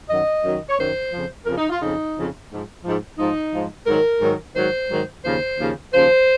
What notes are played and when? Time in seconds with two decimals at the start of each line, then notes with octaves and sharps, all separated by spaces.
0.09 F#2 D#3 F#3 D#5
0.43 F#2 D#3 F#3
0.68 C#5
0.78 F#2 D#3 F#3 C5
1.12 F2 C#3 F3
1.46 F2 C#3 F3 A#4
1.58 D#4
1.70 F4
1.80 F2 C#3 F3 D#4
2.15 F2 C#3 F3
2.50 G#2 F3
2.84 G#2 F3
3.18 G#2 F3 D#4
3.53 G#2 F3
3.87 G#2 D#3 F#3 A#4
4.21 G#2 D#3 F#3
4.55 G#2 D#3 F#3 C5
4.90 G#2 D#3 F#3
5.24 D#2 C#3 F3 C5
5.58 D#2 C#3 F3
5.93 D#2 C#3 F3 C5